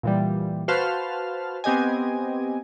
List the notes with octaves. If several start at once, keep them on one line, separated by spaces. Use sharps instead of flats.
A#2 E3 G3
F#4 B4 C5 F5 A5 F6
B3 C4 G4 D#5 G#5